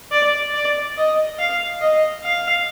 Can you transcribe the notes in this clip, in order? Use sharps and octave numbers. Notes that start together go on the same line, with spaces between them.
D5
D5
D#5
F5
D#5
F5